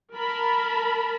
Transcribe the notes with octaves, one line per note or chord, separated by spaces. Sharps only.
A#4 A5 B5